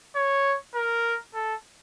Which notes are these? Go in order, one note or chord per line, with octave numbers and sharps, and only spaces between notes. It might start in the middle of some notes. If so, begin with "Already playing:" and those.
C#5
A#4
A4